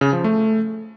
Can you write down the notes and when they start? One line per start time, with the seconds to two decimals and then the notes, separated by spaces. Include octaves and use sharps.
0.01 C#3
0.13 F3
0.24 A3